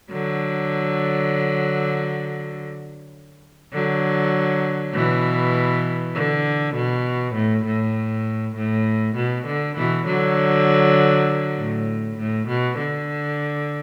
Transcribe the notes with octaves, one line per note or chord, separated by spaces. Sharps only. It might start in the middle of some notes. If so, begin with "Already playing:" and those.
D3 F#3
D3 F#3
B2 E3
D3
B2
A2
A2
A2
B2
D3
B2 E3
D3 F#3
A2
A2
B2
D3